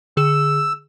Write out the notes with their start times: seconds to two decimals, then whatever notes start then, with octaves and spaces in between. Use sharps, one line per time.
0.17 D3 G#4 E6 E7